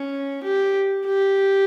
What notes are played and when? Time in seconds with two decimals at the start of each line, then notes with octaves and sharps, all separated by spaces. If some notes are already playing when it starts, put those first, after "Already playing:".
Already playing: C#4
0.43 G4
1.06 G4